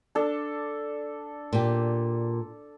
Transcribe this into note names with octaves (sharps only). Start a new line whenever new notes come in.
D4 A4
A#2 G4